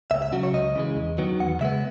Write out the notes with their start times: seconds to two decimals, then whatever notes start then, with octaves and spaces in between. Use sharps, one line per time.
0.11 C#2 E5
0.22 E5
0.32 C#3 F#3 F#4
0.43 C#5
0.53 C#2 D#5
0.75 C#3 E3 G#3
0.96 E2
1.18 D#3 F#3 B3
1.40 E2 F#5
1.61 C#3 G#3 B3 E5